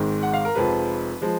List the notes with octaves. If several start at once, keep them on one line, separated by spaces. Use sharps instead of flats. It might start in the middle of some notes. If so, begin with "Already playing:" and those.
Already playing: G#1 G#2 D#3 G#3
F#5
F5
A#4
F1 F2 F3 G#3 B4
F3 G#3